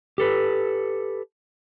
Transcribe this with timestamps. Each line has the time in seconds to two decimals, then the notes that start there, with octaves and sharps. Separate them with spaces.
0.18 G4 A4 B4